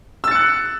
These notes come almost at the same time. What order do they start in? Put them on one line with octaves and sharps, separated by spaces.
E6 A6 C#7 F#6